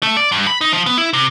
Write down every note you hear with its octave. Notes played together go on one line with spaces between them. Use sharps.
A3
D5
G2
B5
D#4
F3
B3
E4
C3